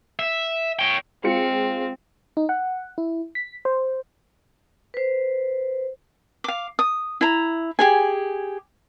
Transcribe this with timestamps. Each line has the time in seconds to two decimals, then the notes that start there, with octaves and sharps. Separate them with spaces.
0.19 E5
0.79 C#5 G5
1.24 G#3 C4 F4 C#7
2.37 D#4
2.49 F#5
2.98 E4
3.35 B6
3.65 C5
4.94 B4 C5
6.44 F5 D6
6.79 D#6
7.21 E4 A#5
7.79 G4 G#4 G#5